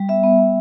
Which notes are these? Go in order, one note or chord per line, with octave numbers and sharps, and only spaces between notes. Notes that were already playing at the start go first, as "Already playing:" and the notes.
Already playing: G3
B3 E5
B3
B3